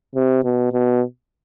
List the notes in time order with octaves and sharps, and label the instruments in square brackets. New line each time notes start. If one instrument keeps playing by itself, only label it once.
[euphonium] C3
B2
B2